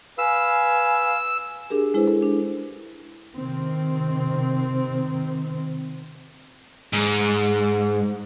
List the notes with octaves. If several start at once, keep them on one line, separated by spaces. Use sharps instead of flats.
B4 F5 G#5 E6
D4 G4 G#4 A#4
G#3 E4 G#4 B4 C5
A4
D4
C3 D#3 C4
G#2